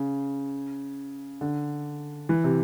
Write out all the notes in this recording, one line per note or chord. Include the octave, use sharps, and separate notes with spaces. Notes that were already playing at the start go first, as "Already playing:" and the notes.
Already playing: C#3
D3
E3
C3